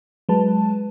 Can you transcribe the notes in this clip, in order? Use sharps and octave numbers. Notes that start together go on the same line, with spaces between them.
F#3 G#3 B4 A5